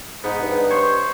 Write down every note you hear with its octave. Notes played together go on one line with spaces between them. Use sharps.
G#2 B3 D#4
G2
C5 C#5